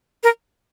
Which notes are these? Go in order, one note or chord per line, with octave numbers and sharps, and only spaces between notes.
A#4